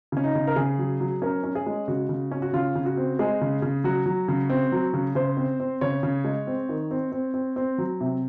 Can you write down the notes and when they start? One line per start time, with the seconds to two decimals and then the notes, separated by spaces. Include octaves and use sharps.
0.12 C#3 C#4
0.24 D#4
0.35 C#3
0.47 A#4
0.56 C#3 G#4
0.79 F#3
1.00 F#3
1.22 C#4 A#4
1.44 C#4
1.55 G#4
1.66 G#3
1.88 C#3 F#4
2.09 C#3
2.31 C#4
2.42 F#4
2.53 C#3 F4
2.75 C#3
2.86 F#4
2.97 C4
3.19 G#3 G#4
3.41 C#3
3.62 C#3
3.84 F#3 F#4
4.06 F#3
4.28 C#3
4.49 C4
4.72 F#3
4.94 C#3
5.15 C#3 C5
5.37 C4
5.60 C4
5.81 C#3 C#5
6.03 C#3
6.24 G#3
6.47 C4
6.69 D#3
6.91 C4
7.12 C4
7.34 C4
7.56 C4
7.78 F#3
8.01 C3